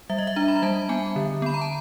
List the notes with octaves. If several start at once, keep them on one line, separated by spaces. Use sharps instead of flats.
G3 E5
D#5
E5
D4 A#5
B5
A#5
G3 A5
B3 G#5
D3
B3 B5
A#5
A5